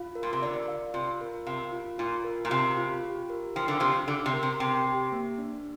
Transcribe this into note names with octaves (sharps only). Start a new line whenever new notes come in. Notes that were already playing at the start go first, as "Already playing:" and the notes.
Already playing: F4 F5
A#4
A#2
C3
D3 D5
F5
C3 F4
A#4
C3 F5
F4
A#2 F4
A#4
A#2
C3 F5
F4
G4
A#4
F3 G5
D3
C3 F3 G4
D3 G4
C3
A#4
C3
C3 G5
G4
A#3
D4